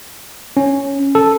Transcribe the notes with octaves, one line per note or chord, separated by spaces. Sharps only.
C#4
A4